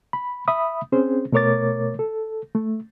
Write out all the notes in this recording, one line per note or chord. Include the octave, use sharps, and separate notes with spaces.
B5
E5 B5 D#6
C4 C#4 G#4 C5
B2 A3 A#4 C#5 D6 A6
A4
A3